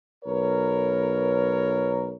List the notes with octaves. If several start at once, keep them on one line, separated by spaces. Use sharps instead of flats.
B1 A#4 B4 C#5